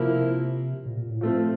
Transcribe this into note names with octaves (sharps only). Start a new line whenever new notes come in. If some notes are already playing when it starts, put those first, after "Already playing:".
Already playing: C3 F3 A#3 E4 A#4
A#2
A#2
A2
F3 A3 C4